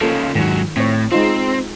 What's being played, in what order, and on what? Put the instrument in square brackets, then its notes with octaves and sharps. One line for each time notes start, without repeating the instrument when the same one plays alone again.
[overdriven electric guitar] C#3 F3 [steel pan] A#3 F4 A4
[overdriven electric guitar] G#2 F#3 [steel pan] D#3
[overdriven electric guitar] A2 [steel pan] C4 C#5
[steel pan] G#3 D#4 F4 [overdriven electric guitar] C4